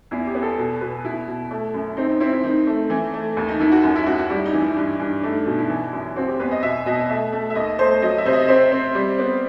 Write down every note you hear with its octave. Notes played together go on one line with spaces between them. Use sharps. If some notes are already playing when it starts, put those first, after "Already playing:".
E2 E4
G4
B3
A4
B2 A4
B2 B4
B2 E4
B2
A3
F#2
C4 D#4
D#4
C4 E4
E4
D#3 D#4
A3
E3
A3
D#2
D#4
D#3 E4
F#4
F#2 F#4
E4
F#2 F#4
F#4
G3 E4
D#4
E3
E4
G2
G2
A3 D#4
B2 D#4
E4
E3
F#2
C4 F#4
G4
E2 B4
D#5
B2 E5
B2 D#5
A3 E5
A3
E5
D#2 D#5
A3 C5
F#3 D#5
E5
C3 C5
D#5
C4 C5
C4
G3
B3